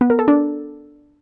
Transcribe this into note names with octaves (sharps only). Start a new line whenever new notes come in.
B3
A#4
A4
D4